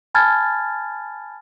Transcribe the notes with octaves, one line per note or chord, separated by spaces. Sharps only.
G#5 A5 B5 F6 G#6 A6